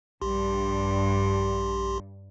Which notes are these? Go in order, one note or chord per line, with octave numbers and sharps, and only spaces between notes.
A#1 G2 G4 C6